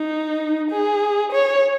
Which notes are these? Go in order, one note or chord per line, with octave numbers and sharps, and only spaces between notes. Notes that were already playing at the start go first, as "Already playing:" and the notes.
Already playing: D#4
G#4
C#5